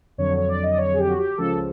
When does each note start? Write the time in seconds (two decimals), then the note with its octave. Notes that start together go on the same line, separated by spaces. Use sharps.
0.18 F2 D3 F#3 C#5
0.37 C#5
0.48 D5
0.63 D#5
0.73 D5
0.78 C#5
0.94 G#4
0.98 G4
1.08 F#4
1.18 G4
1.38 C#2 C#3 F3 A4